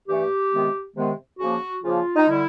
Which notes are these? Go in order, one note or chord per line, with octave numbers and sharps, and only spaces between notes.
G2 E3 A3 G4
C3 D#3 G#3 B3
C3 D#3 G#3 B3
C#3 F3 A#3 F#4
C#3 F3 A#3 F4
D#4
D3 G3 E4